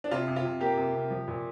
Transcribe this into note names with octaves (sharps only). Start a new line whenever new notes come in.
D4
C3 F4
C3
F4
C3
A#3 G4
C3
C3
F3
A#2